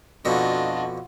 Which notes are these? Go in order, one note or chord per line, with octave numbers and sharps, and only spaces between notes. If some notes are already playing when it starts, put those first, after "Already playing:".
F2 B2 D3 D4 F4 F#4 D#5